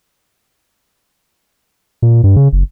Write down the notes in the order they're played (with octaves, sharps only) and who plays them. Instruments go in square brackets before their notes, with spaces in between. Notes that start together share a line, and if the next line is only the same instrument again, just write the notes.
[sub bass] A#2
G2
C#3
F#1